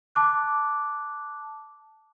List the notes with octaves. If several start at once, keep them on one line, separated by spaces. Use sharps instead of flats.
A5 D6 F#6